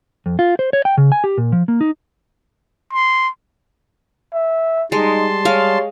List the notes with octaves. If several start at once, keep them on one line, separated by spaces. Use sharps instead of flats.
F2
F4
C5
C#5
G5
C#3
G#5
G4
A#2
F3
A#3
D#4
C6
E5
G3 G#3 D#4 A5 C6
G#3 C#5 F5